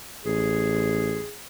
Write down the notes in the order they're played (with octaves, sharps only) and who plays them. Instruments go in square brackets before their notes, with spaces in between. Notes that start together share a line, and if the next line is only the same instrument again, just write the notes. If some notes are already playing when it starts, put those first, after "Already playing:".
[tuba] A1 [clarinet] G#4